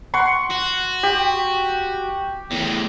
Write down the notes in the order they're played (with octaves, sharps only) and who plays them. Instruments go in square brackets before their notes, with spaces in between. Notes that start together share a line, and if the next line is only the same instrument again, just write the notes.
[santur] F#5 C6 C#6
[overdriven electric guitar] F#4
[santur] G4
[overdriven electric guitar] E2 A2